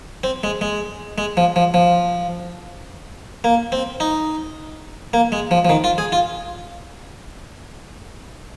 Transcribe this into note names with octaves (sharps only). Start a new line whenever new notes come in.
C4
G#3
G#3
G#3
F3
F3
F3
A#3
C4
D#4
A#3
G#3
F3
F3
D#3
F4
G#4
F4